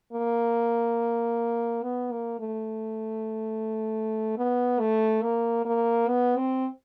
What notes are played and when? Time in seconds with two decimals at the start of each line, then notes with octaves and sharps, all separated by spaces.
0.13 A#3
1.83 B3
2.12 A#3
2.39 A3
4.38 B3
4.80 A3
5.23 A#3
5.65 A#3
6.09 B3
6.37 C4